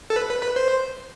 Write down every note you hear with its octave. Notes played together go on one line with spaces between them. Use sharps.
A4
B4
B4
B4
C5